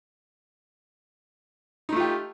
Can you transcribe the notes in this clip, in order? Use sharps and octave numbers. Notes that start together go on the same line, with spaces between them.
A3 D#4 F4 G4